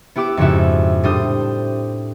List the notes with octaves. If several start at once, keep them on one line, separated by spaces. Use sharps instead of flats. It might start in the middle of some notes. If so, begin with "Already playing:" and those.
B3 E4 G4 D6 E6
F2 G#2 C#3 E4 F#4 E5
A2 G3 D4 C5 D#6 G6